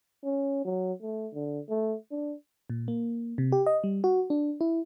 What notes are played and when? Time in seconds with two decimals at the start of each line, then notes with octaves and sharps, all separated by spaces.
0.24 C#4
0.65 F#3
1.02 A3
1.34 D3
1.69 A3
2.11 D4
2.70 A#2
2.88 A#3
3.38 C3
3.52 G4
3.66 D#5
3.84 G3
4.04 F#4
4.30 D4
4.61 E4